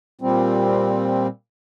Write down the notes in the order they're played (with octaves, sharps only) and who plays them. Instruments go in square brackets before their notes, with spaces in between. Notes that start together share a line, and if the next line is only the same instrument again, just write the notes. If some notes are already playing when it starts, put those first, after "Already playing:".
[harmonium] A#2 G3 C4